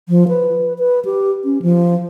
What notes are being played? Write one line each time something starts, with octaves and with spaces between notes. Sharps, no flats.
F3
B4
B4
G4
C#4
F3